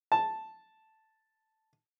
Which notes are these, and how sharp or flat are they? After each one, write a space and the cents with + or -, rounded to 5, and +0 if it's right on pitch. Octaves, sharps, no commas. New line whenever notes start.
A5 +0